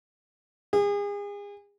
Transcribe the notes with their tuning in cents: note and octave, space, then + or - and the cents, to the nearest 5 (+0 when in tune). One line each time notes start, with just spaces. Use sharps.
G#4 -35